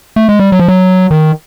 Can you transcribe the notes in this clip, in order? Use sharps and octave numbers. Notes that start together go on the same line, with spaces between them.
A3
G#3
G3
F#3
F3
F#3
D#3